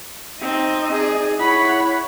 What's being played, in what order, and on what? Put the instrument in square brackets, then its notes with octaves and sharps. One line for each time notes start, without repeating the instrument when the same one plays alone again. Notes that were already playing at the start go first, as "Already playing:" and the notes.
[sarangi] C4 [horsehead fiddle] D#4 D#5
[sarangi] G#4
[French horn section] E4 [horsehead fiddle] C#5 F#5 [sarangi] B5